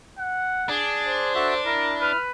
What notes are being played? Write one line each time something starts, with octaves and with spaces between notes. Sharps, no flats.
F#5
D4 G#4
C5
F#4 A4 E5
E4 A#4
B4 F6